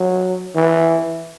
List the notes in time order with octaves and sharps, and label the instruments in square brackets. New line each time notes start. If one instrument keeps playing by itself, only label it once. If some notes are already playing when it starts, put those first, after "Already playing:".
Already playing: [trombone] F#3
E3